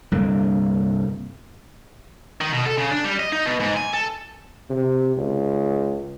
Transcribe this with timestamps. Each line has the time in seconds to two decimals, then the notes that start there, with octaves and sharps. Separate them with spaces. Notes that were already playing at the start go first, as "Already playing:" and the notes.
0.12 C2 G2 D3 A#3
2.41 D#3
2.52 B2
2.65 A4
2.77 C#3
2.91 D4
3.04 G3
3.20 D#5
3.33 D#4
3.46 B2
3.60 G#2
3.77 G#5
3.94 A4
4.70 C3
5.17 C#2